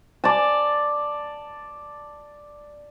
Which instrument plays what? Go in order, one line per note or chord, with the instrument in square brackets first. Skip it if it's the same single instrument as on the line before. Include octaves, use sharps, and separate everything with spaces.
[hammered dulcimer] D5 A5